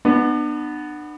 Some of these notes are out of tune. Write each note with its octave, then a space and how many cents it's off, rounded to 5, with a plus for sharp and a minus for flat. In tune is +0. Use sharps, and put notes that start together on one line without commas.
B3 +0 D4 +40